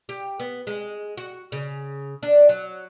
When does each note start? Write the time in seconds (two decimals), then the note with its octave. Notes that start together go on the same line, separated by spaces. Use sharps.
0.09 G4
0.40 B3
0.67 G#3
1.17 F#4
1.52 C#3
2.23 D4
2.49 F#3